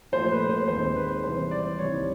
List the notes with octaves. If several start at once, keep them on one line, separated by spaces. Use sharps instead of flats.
A#2 F3 A3 C5
B4
C5
D#2 D#3 G#3 C4 C5
B4
C3 E3 G3 C5
D5
C2 C3 D#3 G3 C4 C#5